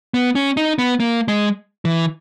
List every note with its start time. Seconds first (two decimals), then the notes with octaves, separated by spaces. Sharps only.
0.14 B3
0.35 C#4
0.57 D#4
0.78 B3
1.00 A#3
1.28 G#3
1.85 E3